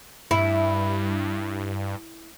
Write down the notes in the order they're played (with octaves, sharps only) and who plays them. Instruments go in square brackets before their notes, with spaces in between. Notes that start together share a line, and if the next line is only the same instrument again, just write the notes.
[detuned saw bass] G2 [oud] E4